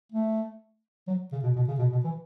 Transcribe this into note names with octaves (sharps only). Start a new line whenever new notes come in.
A3
F#3
C#3
B2
B2
C#3
B2
B2
E3